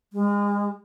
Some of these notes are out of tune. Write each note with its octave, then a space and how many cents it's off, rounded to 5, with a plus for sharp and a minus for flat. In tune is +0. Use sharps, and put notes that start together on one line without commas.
G#3 -35